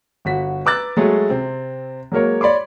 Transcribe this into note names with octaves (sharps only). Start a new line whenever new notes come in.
G1 F#4 B6
B4 A#5 D6 E6 F#6 A6
F#3 G#3 A3 G#4
C3 C4
F#3 G#3 A#3 A#4 C#5
C#5 D5 B5 C6 D6